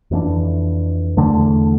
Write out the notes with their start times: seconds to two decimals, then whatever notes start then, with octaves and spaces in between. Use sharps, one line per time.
0.11 F2 E3 A#3 D4
1.17 E2 D3 A3 D4